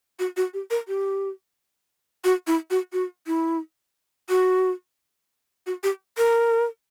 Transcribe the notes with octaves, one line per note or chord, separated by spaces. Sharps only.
F#4
F#4
G4
A#4
G4
F#4
E4
F#4
F#4
E4
F#4
F#4
G4
A#4